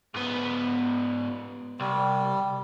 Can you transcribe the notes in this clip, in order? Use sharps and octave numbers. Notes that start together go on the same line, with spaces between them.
G#2 B3
C2 G3